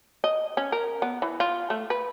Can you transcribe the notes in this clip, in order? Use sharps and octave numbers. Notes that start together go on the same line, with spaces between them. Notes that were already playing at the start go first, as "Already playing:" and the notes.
D#5
C#4
A#4
B3
E3
F4
A3
B4